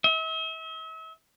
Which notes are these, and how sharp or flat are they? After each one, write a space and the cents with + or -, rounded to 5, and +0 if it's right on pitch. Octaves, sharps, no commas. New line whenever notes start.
E5 -40